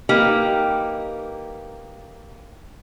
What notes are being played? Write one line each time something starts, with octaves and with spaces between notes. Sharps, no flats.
A#3 D#4 G4 B4